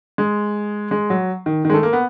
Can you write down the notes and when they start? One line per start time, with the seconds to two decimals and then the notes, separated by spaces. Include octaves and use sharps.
0.18 G#3
0.91 G#3
1.10 F#3
1.46 D#3
1.65 D#3
1.70 G#3
1.74 A3
1.83 A#3
1.93 B3